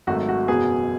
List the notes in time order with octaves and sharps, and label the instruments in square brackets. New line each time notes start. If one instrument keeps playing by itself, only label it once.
[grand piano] G#1 G#2 F#3 A3 F#4
F#4
F#1 E2 B2 F#3 B3 G#4